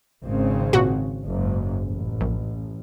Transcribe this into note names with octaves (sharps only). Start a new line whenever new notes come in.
G#1 C#3 C4
A#2 F#4
F#1 G#2
A1
A#1